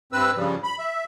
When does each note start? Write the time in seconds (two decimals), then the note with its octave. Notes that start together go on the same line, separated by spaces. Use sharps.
0.12 G2 C4 B4 E6
0.36 G2 C#3 F3 G3
0.63 B5
0.79 E5